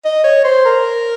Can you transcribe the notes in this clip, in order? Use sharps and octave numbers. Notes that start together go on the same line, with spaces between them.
D#5
C#5
C5
A#4